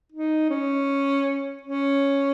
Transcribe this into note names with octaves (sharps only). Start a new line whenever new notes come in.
D#4
C#4
C#4